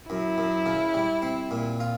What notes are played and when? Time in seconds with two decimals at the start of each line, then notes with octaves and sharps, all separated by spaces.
0.09 F#2 E4
0.38 F#2
0.66 C#3
0.94 G3
1.22 C4
1.51 A#2
1.80 F4